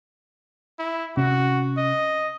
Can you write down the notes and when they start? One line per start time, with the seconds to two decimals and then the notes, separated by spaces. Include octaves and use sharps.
0.79 E4
1.17 C3 C#4 F#4
1.78 D#5